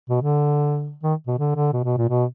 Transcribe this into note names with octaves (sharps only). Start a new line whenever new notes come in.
B2
D3
D#3
B2
D3
D3
B2
B2
A#2
B2